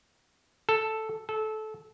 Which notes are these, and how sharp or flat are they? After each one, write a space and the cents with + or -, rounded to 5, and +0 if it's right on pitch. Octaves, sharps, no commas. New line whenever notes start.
A4 +0
A4 -20